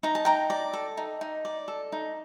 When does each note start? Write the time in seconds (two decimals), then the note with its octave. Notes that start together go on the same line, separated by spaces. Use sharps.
0.03 D#4 A#5
0.15 A5
0.25 D#4 G5 A#5
0.50 D5
0.73 A4
0.97 D#4
1.21 D#4
1.45 D5
1.68 A4
1.92 D#4